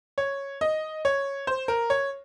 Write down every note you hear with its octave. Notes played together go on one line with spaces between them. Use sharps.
C#5
D#5
C#5
C5
A#4
C#5